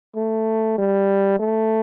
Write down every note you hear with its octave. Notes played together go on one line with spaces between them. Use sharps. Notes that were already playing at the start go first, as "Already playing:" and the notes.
A3
G3
A3